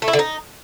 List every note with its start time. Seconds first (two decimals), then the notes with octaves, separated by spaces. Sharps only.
0.02 A3
0.08 E4
0.13 D3
0.19 D#4